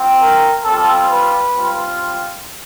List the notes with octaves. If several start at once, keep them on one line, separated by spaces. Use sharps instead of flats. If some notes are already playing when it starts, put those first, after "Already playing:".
Already playing: C4 F4
A#4
G3 C4 F4 A4
B4
G3 C4 F4